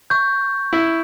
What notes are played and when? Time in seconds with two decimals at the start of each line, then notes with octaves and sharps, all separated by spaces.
0.10 C#6 G6
0.73 E4